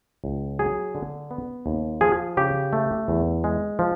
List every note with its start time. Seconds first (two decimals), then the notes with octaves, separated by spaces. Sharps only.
0.24 C#2
0.59 F#3 G#4
0.95 D3
1.31 B3
1.66 D#2
2.01 F3 G#4
2.37 C#3 G4
2.73 A3
3.08 E2
3.44 G#3
3.79 F3